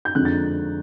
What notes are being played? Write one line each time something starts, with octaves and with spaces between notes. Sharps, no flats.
G6
F2 D3 F3 G#3 F#6
A6